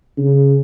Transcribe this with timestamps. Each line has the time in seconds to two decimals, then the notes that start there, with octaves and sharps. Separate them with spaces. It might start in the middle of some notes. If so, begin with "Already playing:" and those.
0.17 C#3